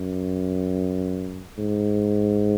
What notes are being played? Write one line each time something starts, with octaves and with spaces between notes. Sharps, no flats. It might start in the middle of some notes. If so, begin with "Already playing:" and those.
Already playing: F#2
G#2